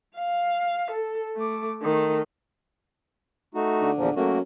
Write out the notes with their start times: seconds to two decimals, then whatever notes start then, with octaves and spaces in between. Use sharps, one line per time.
0.16 F5
0.91 A4
1.36 A3 D6
1.82 D#3 A3
3.55 A3 D#4 F#4
3.81 D3
3.97 E2 A#2 F3
4.16 F#2 A3 A#3 F#4